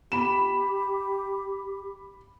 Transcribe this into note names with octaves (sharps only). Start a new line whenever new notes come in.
G4 B5 E7